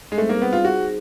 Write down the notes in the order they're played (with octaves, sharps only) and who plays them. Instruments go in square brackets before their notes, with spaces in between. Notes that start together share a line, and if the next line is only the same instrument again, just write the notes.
[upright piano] G#3
[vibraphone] G3 C4 D#4 G#4 C5 [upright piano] A3
[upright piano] A#3
B3
F4
[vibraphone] D#4 G#4 C5 [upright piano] F#4